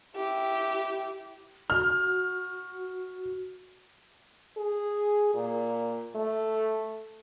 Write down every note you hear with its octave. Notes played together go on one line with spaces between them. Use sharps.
E4 G4
F#4 F6
G#4
A#2
A3